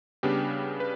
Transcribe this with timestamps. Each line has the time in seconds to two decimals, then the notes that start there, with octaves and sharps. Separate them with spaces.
0.23 C#3 G3 B3 D4 G4
0.80 B4